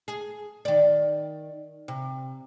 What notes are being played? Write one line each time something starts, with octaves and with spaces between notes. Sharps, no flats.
G#4
D#3 D5
C3